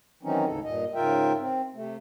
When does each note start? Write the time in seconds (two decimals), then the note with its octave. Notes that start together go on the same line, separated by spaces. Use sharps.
0.23 D#3 E3 F#3 C4 C#4 D#4
0.46 D2 G#2 C#3 A4
0.64 G2 A#2 D#5
0.95 G#2 C#3 F4 A#4 E5 G5
1.39 C4
1.74 C3 A3